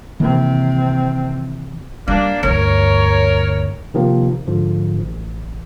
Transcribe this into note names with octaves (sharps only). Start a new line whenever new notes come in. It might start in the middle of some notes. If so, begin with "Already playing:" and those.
C3 D#3 E3 A#3 C4
G3 A#3 D4
D2 G2 A#4 C#5
C3 D#3 F3 A#3
G#2 D3 F3
A1